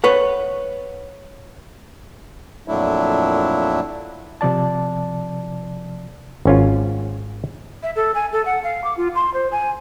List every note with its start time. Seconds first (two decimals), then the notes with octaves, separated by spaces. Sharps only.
0.04 B4 C#5 F#5
2.68 F2 A#2 F#3 A3 D4 E4
4.41 C3 F3 D5 A5
6.45 G#1 C#4 F4
7.83 E5
7.96 A4
8.14 G#5
8.32 A4
8.45 F#5
8.63 F5
8.84 D6
8.97 F4
9.15 C6
9.34 C5
9.51 G#5